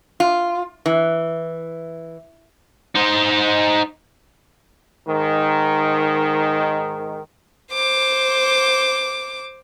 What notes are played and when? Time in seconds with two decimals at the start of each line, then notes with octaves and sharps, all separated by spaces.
0.20 F4
0.86 E3
2.95 D#4 C5
5.07 G#2 D#3
7.73 C5 D6